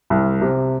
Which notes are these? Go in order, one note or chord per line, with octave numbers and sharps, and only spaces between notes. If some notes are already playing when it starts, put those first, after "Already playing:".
C2
C3